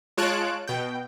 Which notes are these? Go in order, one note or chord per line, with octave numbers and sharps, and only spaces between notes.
G#3 F4 C#5 A5 F#6 D7
B2 G5